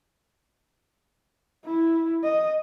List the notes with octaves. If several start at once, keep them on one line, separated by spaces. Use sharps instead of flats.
E4
D#5